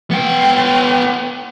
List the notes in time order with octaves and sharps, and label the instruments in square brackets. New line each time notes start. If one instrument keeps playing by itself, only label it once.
[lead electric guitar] B3 G5